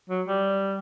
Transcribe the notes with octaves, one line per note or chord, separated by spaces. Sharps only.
F#3
G3